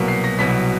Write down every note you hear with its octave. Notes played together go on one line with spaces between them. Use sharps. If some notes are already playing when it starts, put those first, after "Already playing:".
Already playing: C2 B2 F#3 A#3 B6
C7
A#6
C2 B2 F#3 B6